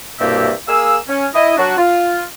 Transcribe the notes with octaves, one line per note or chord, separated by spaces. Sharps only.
C2 G2 B2 A#3 G4 E5
A#3 G#4 F5 G#5 E6
C#4
E4 D#5
F#3 D4 F#4
F4